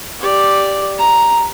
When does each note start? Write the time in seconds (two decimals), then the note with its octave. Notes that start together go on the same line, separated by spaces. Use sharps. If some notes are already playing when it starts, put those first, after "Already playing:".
0.20 G4 D5
0.98 A#5